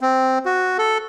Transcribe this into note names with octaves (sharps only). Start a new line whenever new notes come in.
C4
F#4
A4